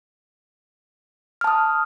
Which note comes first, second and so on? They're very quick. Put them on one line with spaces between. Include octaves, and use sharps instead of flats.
F6 A5 D#6